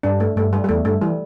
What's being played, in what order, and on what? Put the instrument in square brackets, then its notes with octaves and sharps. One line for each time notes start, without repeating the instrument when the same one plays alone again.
[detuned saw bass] G2 [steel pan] D4
[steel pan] A3
[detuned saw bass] G2 [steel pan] A3
[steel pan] G3
G3
[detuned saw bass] E2 [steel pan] A3
[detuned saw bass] G2 [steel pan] A3
[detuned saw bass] E3 [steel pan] G3